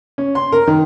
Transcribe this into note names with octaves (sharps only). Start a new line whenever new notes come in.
C#4
C6
A#4
D#3